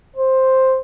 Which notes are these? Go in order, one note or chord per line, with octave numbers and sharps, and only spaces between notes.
C5